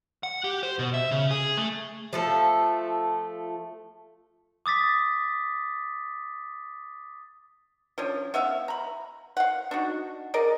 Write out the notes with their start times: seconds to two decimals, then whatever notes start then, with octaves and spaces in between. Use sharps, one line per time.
0.23 F#5
0.44 G4
0.63 C5
0.79 B2
0.94 E5
1.11 C#3
1.31 G#4
1.57 A3
2.13 F3 A3 A4
4.66 D6 D#6 A6 B6
7.98 F3 C#4 D4
8.34 B3 E5 F5
8.68 A#5 B5
9.37 F5 F#5
9.71 D4 D#4 F#4
10.34 G#4 A#4 D5 D#5